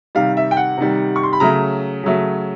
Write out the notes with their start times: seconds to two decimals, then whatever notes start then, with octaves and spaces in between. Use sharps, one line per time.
0.15 C3 D#3 G3 F5
0.37 E5
0.51 G5
0.57 F#5
0.77 C3 D#3 G3
1.16 C#6
1.23 C6
1.33 B5
1.40 C#3 F#3 A3 A#5
2.04 C#3 F#3 A3